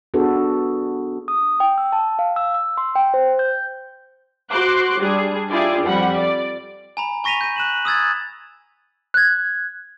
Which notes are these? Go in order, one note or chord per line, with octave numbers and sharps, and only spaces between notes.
B3 D4 F#4 G#4 A4 B4
D#6
G5
E6
A5
F5
E6
E6
C6
G5
C5
G6
F#4 C5 C6 D6 F#6
G3 D4 G#4
D4 E4 F4 G4 G#4 D5
F2 G3 F#5 B5
D5
G#5 A#5 B5
G#5 C#6 A#6 B6 D#7 F7
G6 D#7
F#6 E7 F#7
D#6 E6 G#6 A6
F#6 G#6